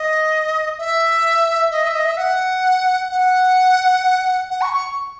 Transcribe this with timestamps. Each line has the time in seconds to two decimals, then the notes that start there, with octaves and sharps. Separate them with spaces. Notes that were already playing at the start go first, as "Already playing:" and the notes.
Already playing: D#5
0.78 E5
1.71 D#5
1.83 E5
1.95 D#5
2.06 E5
2.17 F#5
3.11 F#5
4.50 F#5
4.62 C#6
4.73 C#6